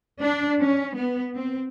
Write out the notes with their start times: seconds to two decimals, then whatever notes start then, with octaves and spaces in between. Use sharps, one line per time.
0.21 D4
0.61 C#4
0.94 B3
1.35 C4